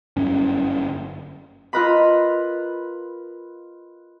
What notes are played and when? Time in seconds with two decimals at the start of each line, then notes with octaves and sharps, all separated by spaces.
0.17 G1 F#2 C#4
1.73 F4 A#4 B4 D#5 B5